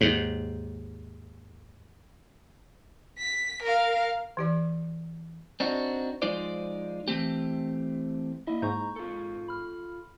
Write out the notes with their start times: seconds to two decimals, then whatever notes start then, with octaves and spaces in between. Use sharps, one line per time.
0.01 D#2 G#2
3.18 B6
3.62 A#4 F5
4.37 E3 G4 D5
5.60 C4 D4 D#4 F#4
6.22 F3 G#3 D#4 F4 C5 D5
7.08 E3 A3 C4 G4
8.47 A#3 E4 D#5 E5
8.62 G#2 A#5 C#6 G6
8.96 F4 A4
9.48 B5 F6